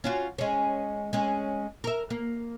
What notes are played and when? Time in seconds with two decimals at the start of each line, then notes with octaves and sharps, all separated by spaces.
0.04 C#4 F4 F#4
0.38 G#3 C#4
1.13 G#3 C#4
1.84 A#4 E5
2.10 A#3